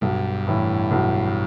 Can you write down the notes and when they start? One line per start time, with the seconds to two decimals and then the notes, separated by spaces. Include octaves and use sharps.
0.01 B1 G2
0.47 A2 E3
0.91 B1